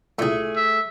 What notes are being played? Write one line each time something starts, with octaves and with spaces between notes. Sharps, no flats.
C2 A#2 A3 G#4
E5